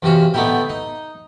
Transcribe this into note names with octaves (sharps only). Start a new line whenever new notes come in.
E2 C3 C#4 F#4 F5
D3 A3 B3 D#4 E4 G4
D#4